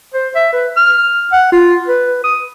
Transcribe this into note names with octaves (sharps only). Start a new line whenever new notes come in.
C5
E5
B4
F6
F#5
F4
B4
D#6